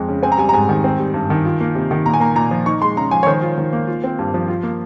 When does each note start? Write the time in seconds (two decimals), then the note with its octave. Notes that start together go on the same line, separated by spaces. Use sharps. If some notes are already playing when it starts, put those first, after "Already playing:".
Already playing: F2 G#3
0.09 C#3
0.23 C4 G#5
0.32 A#5
0.38 G3 G#5
0.49 A#5
0.53 G#2 G#5
0.69 D#3
0.84 C4
0.99 G3
1.14 G2
1.30 D#3
1.45 F4
1.61 A#3
1.75 C3
1.91 D#3
2.06 A#2 A#5
2.14 G#5
2.20 A#3 A#5
2.35 A#2 A#5
2.51 F3
2.66 D#4 C#6
2.81 G#3 C6
2.97 C#3 A#5
3.11 F3 G#5
3.23 C#5
3.27 D#3 C5
3.42 F4
3.58 D#3
3.73 A#3
3.87 F4
4.04 C4
4.19 G2
4.34 F3
4.48 F4
4.63 A#3